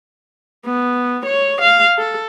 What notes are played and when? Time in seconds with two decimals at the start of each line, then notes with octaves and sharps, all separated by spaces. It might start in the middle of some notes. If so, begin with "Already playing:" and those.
0.66 B3
1.26 C#5
1.62 F5
1.98 A4